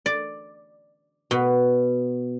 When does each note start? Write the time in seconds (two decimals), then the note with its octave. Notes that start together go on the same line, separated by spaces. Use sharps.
0.06 D5
1.31 B2